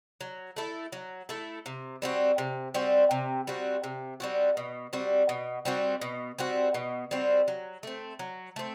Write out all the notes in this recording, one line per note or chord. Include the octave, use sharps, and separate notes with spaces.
F#3
A3 E4 A4
F#3
A3 E4 A4
C3
G3 C4 F#4
C3
G3 C4 F#4
C3
G3 C4 F#4
C3
G3 C4 F#4
B2
G3 C4 F#4
B2
G3 C4 F#4
B2
G3 C4 F#4
B2
G3 C4 F#4
F#3
A3 C4
F#3
A3 C4